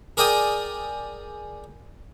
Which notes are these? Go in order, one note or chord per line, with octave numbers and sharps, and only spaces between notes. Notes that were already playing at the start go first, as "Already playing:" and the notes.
G#4 A#4 D5 G5 D#6